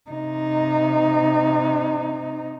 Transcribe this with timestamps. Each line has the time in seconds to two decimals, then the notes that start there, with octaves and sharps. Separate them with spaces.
0.10 C3 D#4